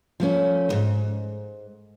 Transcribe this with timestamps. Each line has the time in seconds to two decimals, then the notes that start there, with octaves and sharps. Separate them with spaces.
0.20 F3 A3 C#4
0.69 D#2 G#2